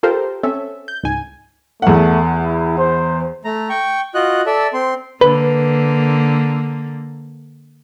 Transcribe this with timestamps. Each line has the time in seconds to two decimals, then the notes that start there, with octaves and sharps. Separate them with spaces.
0.03 F4 G4 A4 A#4 C5
0.43 C4 C#4 A4 E5
0.88 G6
1.04 C#2 G#2 G#5
1.82 E2 A3 F#5
2.44 E4
2.78 C5
3.45 A3 A#5
3.70 G5 C#6
4.15 F4 F#4 D#5 F#6
4.46 A4 D5 E5
4.74 C4 C6
5.21 D3 A#3 B4